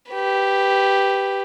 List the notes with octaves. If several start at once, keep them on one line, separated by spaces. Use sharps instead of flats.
G4 B4